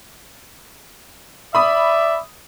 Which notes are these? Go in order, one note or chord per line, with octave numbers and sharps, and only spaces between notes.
D5 E5 B5 D#6